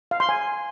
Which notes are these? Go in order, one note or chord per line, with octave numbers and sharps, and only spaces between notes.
F5
C6
G#5